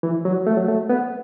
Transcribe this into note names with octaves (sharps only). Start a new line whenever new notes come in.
E3
F#3
A3
F#3
A3
B3